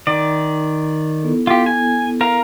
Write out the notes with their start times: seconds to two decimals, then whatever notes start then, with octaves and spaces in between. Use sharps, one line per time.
0.07 D#3 D5
1.23 B3 E4 A4
1.47 F4 G4
1.66 G#5
2.21 A#4 F5